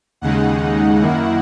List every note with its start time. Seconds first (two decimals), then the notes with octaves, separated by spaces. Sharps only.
0.21 D#2 C#3 G#3 D#4 F#5
1.01 F#2 D#3 A#3 E4